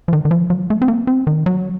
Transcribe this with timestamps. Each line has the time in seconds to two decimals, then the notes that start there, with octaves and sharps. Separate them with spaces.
0.08 F3
0.13 D#3
0.25 D#3
0.31 F3
0.50 F#3
0.70 A3
0.82 C4
0.88 A#3
1.07 C4
1.27 D#3
1.46 F#3